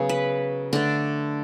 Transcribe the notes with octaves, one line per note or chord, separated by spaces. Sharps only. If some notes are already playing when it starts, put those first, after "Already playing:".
Already playing: C#3 F#3 B3
B4
D3 A3 D4